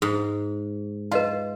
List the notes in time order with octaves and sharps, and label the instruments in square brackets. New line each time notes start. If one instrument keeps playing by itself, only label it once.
[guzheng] G#2 [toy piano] G#4
[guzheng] F4 [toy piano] B4 D#5 F5